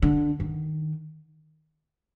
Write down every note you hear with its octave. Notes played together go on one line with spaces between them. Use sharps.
D3
D#3